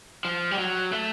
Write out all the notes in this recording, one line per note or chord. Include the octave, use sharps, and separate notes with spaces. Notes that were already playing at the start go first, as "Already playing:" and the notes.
F3
G3
F#3
A3